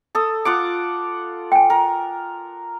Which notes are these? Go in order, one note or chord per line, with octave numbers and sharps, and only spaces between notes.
A4 D#6
F4 F#5 D6
G5 G#5
A#4